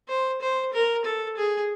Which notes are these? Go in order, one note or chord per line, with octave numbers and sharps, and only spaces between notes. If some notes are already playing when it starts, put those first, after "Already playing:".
C5
C5
A#4
A4
G#4